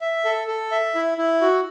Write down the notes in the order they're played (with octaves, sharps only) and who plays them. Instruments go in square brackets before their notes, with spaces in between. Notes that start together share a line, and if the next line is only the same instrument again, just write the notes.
[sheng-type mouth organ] E5
A4
A4
E5
E4
E4
F#4